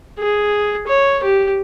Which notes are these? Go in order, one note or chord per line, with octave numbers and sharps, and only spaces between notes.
G#4
C#5
G4